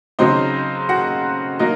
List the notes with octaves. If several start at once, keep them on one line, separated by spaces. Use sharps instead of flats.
C#3 F#3 C4 D#4 D#5
F#4 F#5
F#3 A#3 D#4